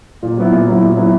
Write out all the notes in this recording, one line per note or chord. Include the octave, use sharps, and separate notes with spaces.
A#2
F#3 B3 E4
A#2
F#3 B3 E4
A#2
F#3 B3 E4